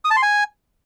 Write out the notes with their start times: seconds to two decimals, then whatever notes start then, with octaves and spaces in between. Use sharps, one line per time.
0.05 D#6
0.11 A5
0.17 C6
0.23 G#5